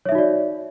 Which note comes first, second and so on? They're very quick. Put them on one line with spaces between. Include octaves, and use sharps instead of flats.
C#5 E5 D#4 F#4 D5